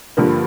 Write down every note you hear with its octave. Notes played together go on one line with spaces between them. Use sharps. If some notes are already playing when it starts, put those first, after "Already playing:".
G2 D3 F3 A#3